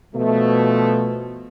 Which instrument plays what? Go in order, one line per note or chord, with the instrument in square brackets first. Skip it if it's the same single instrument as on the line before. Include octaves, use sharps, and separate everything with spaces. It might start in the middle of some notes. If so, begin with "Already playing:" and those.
[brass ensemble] B2 F3 A3